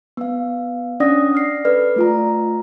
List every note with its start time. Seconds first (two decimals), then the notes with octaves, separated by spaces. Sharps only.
0.17 B3 F5
1.00 C#4 D4 D5 F#5 D#6 A#6
1.35 F6 C7
1.65 A4 B4 D5 F6
1.96 A3 F4 A#5